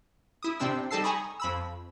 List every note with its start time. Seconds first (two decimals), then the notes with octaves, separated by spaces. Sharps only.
0.43 E4 D#6
0.60 C3 C4 D4 E6
0.91 G3 D#4 A4 A5 E6 C7
1.04 G#5 A#5 B5 C#6 D#6
1.40 F2 B5 E6